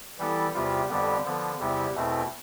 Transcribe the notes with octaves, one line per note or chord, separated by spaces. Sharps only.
E3 G3 B3 E4 A4
E2 C3 G3 B3 F4
F2 D3 G3 B3
D3 F3 B3
E2 C3 G3 B3 E4
E2 B2 A3 C4 E4